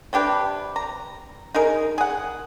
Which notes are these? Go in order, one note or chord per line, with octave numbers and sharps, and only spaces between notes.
C3 D4 G4 B4
A#5
D#4 G#4 A#4
G#4 F#5